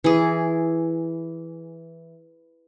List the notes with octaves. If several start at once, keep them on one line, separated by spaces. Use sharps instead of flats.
E3 G#4